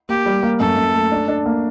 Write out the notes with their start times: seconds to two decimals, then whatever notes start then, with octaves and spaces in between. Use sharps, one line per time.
0.09 A#3 G4
0.26 G3
0.43 A#3
0.60 F#2 A4
0.77 F#2
0.94 A3
1.12 D4
1.28 D4
1.46 A#3